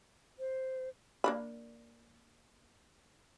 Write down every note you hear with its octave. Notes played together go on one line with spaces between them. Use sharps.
C5
A#3 D4 B5